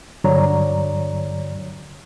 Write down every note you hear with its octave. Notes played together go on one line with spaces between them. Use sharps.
G2 D3 F#3 C#5 D5 A#5